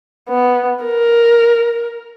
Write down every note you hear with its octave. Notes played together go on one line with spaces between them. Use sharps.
B3
A#4